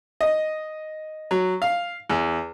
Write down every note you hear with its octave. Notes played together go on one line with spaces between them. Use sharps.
D#5
F#3
F5
E2